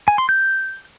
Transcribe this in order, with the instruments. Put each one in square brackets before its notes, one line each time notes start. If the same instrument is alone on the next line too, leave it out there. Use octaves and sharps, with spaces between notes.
[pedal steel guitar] G#5
C6
G6